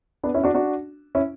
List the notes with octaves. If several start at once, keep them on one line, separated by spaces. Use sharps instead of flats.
B3 D4
C#4 E4
D4 F#4
D4 F#4
C#4 E4